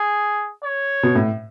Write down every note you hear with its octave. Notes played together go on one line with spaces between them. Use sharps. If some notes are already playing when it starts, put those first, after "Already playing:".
Already playing: G#4
C#5
B2
A2